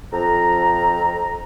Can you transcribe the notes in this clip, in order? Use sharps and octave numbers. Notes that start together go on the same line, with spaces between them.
F2 A#5